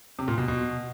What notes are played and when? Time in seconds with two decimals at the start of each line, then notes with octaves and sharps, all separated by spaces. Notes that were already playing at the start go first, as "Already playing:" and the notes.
0.19 C3
0.28 A#2
0.38 B2
0.48 B2